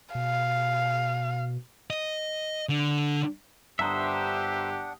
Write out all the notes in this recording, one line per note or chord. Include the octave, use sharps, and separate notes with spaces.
B2 F5
D#5
D3
G1 D4 G4 C5 E5 F#5 A#5 D#6